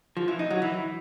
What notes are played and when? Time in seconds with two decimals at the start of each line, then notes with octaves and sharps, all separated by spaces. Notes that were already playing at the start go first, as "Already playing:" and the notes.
0.17 F3
0.28 E3
0.39 D#4
0.51 F#3
0.62 E3